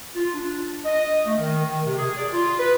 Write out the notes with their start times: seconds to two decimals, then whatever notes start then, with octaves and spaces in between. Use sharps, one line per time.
0.15 F4
0.34 D4
0.85 D#5
1.26 A3
1.38 D#3
1.65 D#3
1.85 C3
1.97 G#4
2.17 D5
2.32 F4
2.59 B4